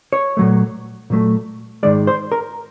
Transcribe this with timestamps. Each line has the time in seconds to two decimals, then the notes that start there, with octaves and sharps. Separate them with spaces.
0.13 C#5
0.37 A#2 F#3 A3
1.10 A#2 F#3 A3
1.83 G#2 D#3 G#3 D5
2.07 C5
2.32 A#4